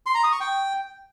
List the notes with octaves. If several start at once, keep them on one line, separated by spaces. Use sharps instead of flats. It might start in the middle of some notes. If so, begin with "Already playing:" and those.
C6
A#5
D#6
C#6
G5